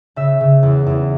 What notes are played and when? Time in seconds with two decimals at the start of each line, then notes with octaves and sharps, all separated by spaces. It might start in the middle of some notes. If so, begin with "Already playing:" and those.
0.16 C#3 E5
0.40 C#3
0.63 E2
0.86 E2